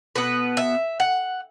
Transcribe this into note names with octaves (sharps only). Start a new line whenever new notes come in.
B2 B3 B4
E5
F#5